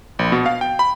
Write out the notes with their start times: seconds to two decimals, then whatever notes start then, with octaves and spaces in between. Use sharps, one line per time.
0.19 A#1
0.32 B2
0.46 F5
0.61 G5
0.79 B5